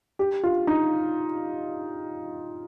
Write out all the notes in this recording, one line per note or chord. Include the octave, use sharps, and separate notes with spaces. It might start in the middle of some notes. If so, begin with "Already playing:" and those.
G4
F4
D#4